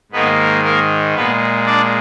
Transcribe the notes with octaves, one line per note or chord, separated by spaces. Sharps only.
G#2 D#3 A#3 B3 B4
A#3 A#4
A#2 G#3 B3 B4
D4 D5